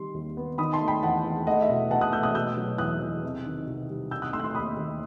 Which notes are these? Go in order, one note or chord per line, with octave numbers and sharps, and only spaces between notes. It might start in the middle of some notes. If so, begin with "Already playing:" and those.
Already playing: D#3 G3 C6
D#2
B3
D#3 B5 D#6
A5 C6
A3
G5 B5
E2 F#5 A5
E2
A3 D#5 F#5
E5
B2
B2 F#5 A5
D#6 F#6
A3 E6 G6
D#6 F#6
B2 E6 G6
F#3
E2 D#6 F#6
E2
C3
D#3
C2
G3
D#3 E6 G6
D#6 F#6
A3 C6 E6
F#6
C6 E6
D#2 B5 D#6
D#2